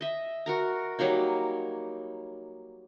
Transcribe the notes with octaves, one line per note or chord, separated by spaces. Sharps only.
D#5 E5
F#4 A#4 A#5
F#3 G3 A#3 D#4